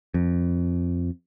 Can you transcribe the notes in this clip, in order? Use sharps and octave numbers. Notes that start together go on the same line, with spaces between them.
F2